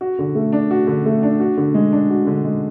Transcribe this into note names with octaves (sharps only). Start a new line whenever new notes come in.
F#4
D3
A3
D4
F#4
D3
A3
D4
F#4
D3
G#3
D4
F#4
D3
G#3